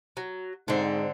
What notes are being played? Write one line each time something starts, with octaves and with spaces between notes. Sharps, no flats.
F#3
G#2 D3 C4 D#4